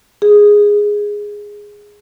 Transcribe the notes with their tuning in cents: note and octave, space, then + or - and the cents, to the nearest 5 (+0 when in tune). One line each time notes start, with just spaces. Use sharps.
G#4 -5